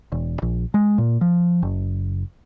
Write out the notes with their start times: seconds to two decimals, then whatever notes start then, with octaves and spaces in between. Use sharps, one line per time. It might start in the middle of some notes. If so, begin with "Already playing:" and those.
0.12 E1
0.42 A#1
0.74 G#3
0.98 A#2
1.21 F3
1.63 F#1